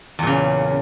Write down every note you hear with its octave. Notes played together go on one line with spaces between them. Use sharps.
E2 A#2 C#3